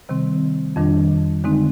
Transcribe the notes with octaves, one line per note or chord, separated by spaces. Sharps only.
C3 D#3 G3 C4
F2 D#3 G3 D4
D3 G#3 C4 D#4